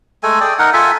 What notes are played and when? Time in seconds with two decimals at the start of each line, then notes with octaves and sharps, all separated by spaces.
0.23 G#3 A3 A4 G#5
0.41 G#4 D5 G5
0.59 D#4 A#4 F#5
0.73 F4 A4 E5 G#5